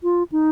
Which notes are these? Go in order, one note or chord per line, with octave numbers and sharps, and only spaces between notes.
F4
D#4